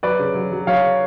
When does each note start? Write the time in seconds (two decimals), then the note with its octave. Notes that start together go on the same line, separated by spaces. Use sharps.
0.03 F#3 B4 D5
0.19 C#3
0.35 F#3
0.52 F#3
0.67 F#3 C#5 F5